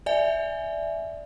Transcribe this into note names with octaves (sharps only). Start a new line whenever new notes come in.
D5 E5 G#5